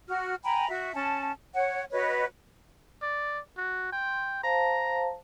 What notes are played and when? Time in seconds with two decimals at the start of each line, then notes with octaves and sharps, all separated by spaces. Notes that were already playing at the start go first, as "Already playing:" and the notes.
0.09 F#4 F6
0.44 G5 G#5 A#5 B5
0.68 F#4 E5
0.95 C#4 A5
1.54 C#5 F#5
1.92 F#4 B4 C#5 D#5
3.02 D5
3.57 F#4
3.93 G5 C6
4.44 C5 F5 A5 A#5